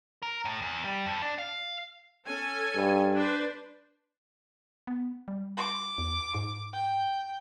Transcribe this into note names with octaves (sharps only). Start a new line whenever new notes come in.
A#4
A2
E2
G3
F2
D4
F5
C#4 A4 G#5
G2
D4 B4 C5
B3
G3
D6
E2
G#2
G5